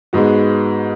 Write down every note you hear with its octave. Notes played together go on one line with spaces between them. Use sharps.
G#2 G#3 B3 F#4